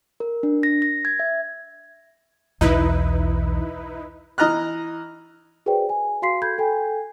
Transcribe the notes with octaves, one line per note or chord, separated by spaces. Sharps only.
A#4
D4
A#6
A#6
G#6
E5
B1 E2 D#4 E4 B4
E3 D#5 A#5 F6 F#6
F#4 G#4 B4 C5 D5 G5
G#5
F#4 F5 C6 B6 C7
F#4 A4 B5 G6 G#6
A4 G5 G#5